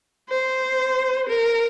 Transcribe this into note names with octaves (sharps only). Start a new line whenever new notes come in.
C5
A#4